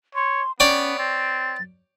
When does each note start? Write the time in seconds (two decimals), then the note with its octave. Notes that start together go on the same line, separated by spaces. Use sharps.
0.15 C#5 C6
0.60 B3 C#4 C#5 D5 G5
0.98 C4 A6